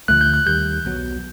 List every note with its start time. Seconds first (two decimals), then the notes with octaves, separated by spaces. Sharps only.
0.08 D2 D3 F3 A3 F#6
0.21 G6
0.34 F#6
0.46 D#2 D#3 G3 G6
0.85 B1 B2 F#3